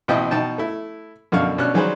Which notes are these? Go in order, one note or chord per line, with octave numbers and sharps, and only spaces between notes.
A1 B2 C4 E4 D#5 G5
B2 D#4 G5 A5
A3 E4
F#2 B2 D3 F5 C#6
B2 C#4 D4 F#6
D#3 F#3 G3 G#4 B4 C5